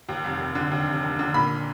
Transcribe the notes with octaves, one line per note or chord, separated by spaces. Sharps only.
D#2
F1
F1
D3
D#2
F1
F1
D3
A#2 B5